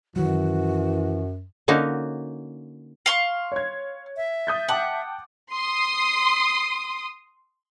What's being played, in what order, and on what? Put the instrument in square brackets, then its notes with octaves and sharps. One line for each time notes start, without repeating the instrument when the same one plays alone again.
[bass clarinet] F#2 [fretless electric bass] D#3 F#3 [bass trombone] E3 [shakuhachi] F#4
[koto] D3 A#3 C#4 D#4 F#4
[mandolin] F5 C6 C#6
[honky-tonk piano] C#5 G#6
[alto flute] E5
[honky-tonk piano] D#6 G6 A6
[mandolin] F#5 [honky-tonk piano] G5 A5 D6
[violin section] C6 D#6